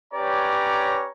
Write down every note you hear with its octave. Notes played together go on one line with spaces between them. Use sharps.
C#4 G4 B4 C#5 D5 A#5